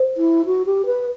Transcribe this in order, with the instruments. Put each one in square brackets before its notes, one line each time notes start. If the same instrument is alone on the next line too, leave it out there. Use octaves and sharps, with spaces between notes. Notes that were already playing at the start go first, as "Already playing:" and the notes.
Already playing: [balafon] C5
[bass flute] E4
F#4
G4
B4